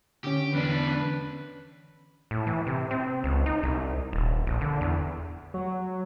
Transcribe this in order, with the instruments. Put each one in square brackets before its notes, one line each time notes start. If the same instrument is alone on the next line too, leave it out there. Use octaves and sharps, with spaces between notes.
[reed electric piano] D3 C#4 [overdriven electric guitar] G4
[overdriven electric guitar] E2 D4 [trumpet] B4
[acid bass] A2
E3
C3
C4
C#2
D#4
C2
D#1
A#1
D3
E2
[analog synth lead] F#3